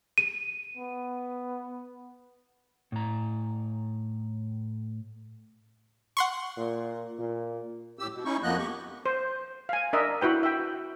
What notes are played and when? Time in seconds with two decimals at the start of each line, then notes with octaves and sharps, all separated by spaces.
0.18 D#7
0.77 B3
2.92 A2 A#5
6.17 F#5 C6 C#6
6.57 A#2
7.19 A#2
7.99 A2 G4 E6
8.13 B2
8.25 C#4 D#4 E4 C#6
8.43 F2 F3 A#3 B3 D#5 F#6
8.58 G4 C#6
9.06 C5
9.69 F5 G#5
9.93 D4 A#4 D#5 E5
10.21 E4 F#4 B4 G5
10.43 E5 G5